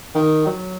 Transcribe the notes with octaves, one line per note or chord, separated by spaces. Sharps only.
D#3
F#3